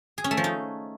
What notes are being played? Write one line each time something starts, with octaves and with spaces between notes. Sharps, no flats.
G#4
C#4
A3
F3
D#4